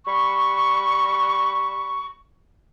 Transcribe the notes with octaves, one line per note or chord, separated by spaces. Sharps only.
G3 B5 C#6